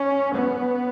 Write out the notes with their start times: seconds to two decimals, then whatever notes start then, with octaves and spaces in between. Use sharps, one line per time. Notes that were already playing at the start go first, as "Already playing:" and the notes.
Already playing: C#4
0.35 B3